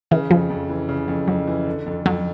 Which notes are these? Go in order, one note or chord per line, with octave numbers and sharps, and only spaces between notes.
C#3 E3
F2 F3
F2
E3
C#3
F2
F2 F#3
E3
D3
F2
F2 F#3